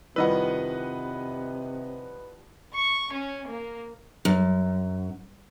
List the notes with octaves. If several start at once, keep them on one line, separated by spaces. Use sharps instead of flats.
F2 C3 D#3 G3 E4 B4 D#5 F#5
C#6
C#4
A#3
F#2